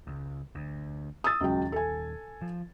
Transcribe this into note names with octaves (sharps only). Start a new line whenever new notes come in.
C#2
D2
D#6 E6 A6
D#1 C#2 F#3 G5
A4 G#5
F3